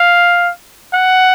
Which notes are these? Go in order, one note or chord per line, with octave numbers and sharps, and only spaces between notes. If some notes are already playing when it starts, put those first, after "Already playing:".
Already playing: F5
F#5